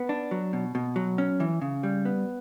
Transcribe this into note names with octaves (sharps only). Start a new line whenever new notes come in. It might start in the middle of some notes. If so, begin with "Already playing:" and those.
Already playing: B3
D4
F#3
B2
B2
F#3
C#4
E3
C#3
G3
B3